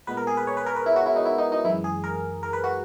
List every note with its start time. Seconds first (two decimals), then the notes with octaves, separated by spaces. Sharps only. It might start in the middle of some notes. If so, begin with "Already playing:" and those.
0.07 A#2 G#3 B3 B4
0.17 A#4
0.27 G#4
0.37 B4
0.47 C#5
0.57 B4
0.66 A#4
0.76 B4
0.86 E4
0.96 F#4
1.06 E4
1.16 D#4
1.25 E4
1.38 D#4
1.52 D#4
1.64 F#2 E3 G#3 E4
1.84 G#4
2.04 A#4
2.43 A#4
2.53 B4
2.64 F#4